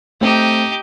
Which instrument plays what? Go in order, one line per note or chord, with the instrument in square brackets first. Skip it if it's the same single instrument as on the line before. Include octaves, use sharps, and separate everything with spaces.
[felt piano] A3 C4 [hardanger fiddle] D#4 G4